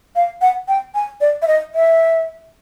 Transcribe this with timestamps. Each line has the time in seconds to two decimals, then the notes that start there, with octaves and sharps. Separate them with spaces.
0.16 F5
0.41 F#5
0.68 G5
0.95 G#5
1.21 D5
1.42 E5
1.48 D#5
1.74 E5